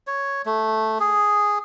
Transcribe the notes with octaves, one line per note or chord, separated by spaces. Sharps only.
C#5
A3
G#4